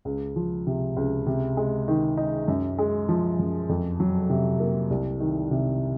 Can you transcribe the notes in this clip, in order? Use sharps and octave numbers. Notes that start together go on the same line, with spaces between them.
C#2
F3
C3
C#2
C3
G#3
D#3
D#4
F#2
G#3
F3
F#2
F2
F#3
C3
A#3
C2
D#3
C3